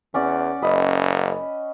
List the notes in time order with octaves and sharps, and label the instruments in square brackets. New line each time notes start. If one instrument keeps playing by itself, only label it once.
[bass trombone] E2 [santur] C#4 D5 F#5
[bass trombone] F#1 [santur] D#5 B5